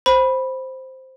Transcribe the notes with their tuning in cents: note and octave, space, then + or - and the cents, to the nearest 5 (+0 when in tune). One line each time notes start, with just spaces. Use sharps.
C5 +0 B5 -5